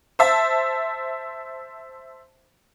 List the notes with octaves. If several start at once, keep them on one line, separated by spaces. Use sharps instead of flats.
C5 E5 A5